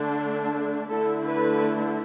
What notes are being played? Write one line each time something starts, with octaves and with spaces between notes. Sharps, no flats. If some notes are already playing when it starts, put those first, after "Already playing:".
Already playing: D3 A3 D4
D3 A3 E4 A4
B4